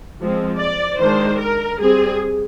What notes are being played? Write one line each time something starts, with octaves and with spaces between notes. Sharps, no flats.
F3 G#3 C4
D5
D#3 G#3 D4 C5
A#4
G3 C4 G#4